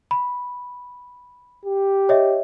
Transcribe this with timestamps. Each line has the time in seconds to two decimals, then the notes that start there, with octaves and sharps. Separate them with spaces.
0.11 B5
1.66 G4
2.09 C#5 D#5 E5